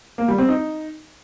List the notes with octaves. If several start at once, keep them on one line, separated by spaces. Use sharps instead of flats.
A#3
G3
C4
D#4